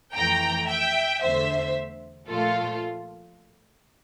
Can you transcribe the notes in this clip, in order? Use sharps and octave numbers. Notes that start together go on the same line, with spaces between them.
F2 E3 A3 G5 A#5
E5 G5
E2 D3 A3 C5 E5
A#2 F3 A3 F4 A4